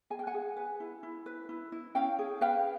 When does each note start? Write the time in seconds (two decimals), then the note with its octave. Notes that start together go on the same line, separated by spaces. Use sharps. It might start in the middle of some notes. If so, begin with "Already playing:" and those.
0.10 G#4 G#5
0.19 G5
0.27 F#5 G#5
0.34 G#4
0.56 B4
0.80 E4
1.03 E4
1.26 B4
1.49 E4
1.72 E4
1.95 C#4 F5 G5
2.19 G#4
2.41 B4 F5 G5